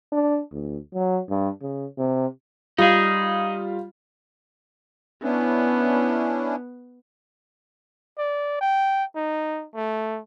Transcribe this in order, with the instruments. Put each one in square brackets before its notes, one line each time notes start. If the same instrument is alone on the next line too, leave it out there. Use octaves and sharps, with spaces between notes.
[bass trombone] D4
D2
F#3
G2
C#3
C3
[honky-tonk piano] G3 F4 [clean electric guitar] D#4 G#4
[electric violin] B3 [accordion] C#4 D4 E4
[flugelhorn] D5
G5
D#4
A3